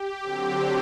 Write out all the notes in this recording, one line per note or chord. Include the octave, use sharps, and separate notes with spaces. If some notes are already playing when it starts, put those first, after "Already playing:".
Already playing: G4
D3 F#3 C4